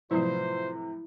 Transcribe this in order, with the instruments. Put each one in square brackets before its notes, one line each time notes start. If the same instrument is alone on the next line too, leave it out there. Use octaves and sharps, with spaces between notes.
[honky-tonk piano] A2 C3 [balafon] F3 F#3 [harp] E4 B4 [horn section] F4 C5